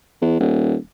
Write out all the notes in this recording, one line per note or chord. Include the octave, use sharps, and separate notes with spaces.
E2
D#1